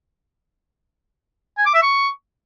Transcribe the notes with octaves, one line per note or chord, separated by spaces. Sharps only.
G#5
D6
E5
C#6